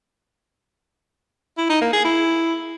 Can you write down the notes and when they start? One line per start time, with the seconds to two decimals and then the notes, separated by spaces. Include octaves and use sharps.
1.57 E4
1.69 D#4
1.81 A#3
1.93 G#4
2.05 E4